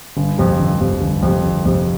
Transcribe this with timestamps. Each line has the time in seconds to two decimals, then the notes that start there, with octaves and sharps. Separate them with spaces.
0.17 G1
0.38 F2 C3
0.59 G1
0.80 F2 C3
1.01 G1
1.23 F2 C3
1.44 G1
1.66 F2 C3